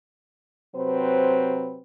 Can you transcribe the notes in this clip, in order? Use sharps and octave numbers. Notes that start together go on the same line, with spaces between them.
C3 F#3 C4 B4 C5